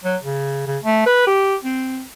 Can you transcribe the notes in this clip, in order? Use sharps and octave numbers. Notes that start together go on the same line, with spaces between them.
F#3
C#3
C#3
A3
B4
G4
C4